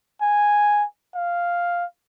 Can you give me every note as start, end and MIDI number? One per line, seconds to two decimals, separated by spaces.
0.22 0.84 80
1.15 1.85 77